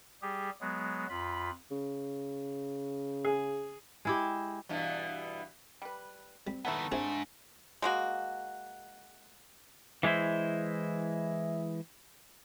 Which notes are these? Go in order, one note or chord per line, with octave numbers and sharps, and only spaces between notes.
G3 G4 G#4
F#3 G#3 B3
F2 F4 B5
C#3
G#4
G#3 E4 G4
G2 B2 E3
G3 B4
G3 C4
D#3 F#3 A3 B3 E4 A5
G#2 C4 D4 G#4 E5
G#3 A#3 F#4
E3 G#3 C4 E4 C5